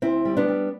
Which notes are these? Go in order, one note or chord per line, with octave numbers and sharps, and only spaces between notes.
D2 C4 E4
G3
B3 D4
G3